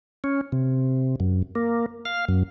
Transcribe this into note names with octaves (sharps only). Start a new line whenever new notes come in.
C#4
C3
F#2
A#3
F5
F#2